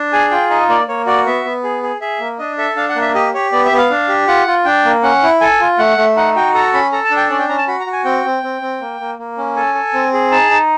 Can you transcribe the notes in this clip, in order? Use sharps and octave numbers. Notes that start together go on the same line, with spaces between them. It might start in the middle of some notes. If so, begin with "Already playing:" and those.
Already playing: D4
G#4 G#5
F4 G5
D#4 D#5
A#3 D5
A#3 C#5
F#4 D5
B3 E5
B3
G#4
G#4
G#4 E5
A#3
D4 D#5
A4 E5
D4 F5
F#5
A#3
E5
G4 D#5
G4 C#5
B3 D5
E5
B3
F5
D4
G4
F4 F#5
F4
D4 G5
A#3
C#4 F#5
E4
A4 G#5
F4
A3 F#5
A3
D#4 F#5
F#4 G5
A4 A#5
C#4 B5
A4 A#5
A5
D4
G5
C#4 D5
G5
C#4 A#5
A5
F#4 B5
A#5
F#4
G#5
C4 G5
C4
C4
C4
A#3
A#3
A#3
C#4
A4 G#5
A4
C4
G#4
D#4 A5
D#4